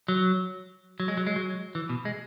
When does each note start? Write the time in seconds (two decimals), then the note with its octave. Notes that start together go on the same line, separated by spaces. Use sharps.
0.08 F#3
1.00 F#3
1.08 G#3
1.17 F#3
1.27 G#3
1.36 F#3
1.75 E3
1.89 B2
2.05 G#3